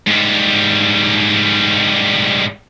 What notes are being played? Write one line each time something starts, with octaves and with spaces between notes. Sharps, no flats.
G#2 G3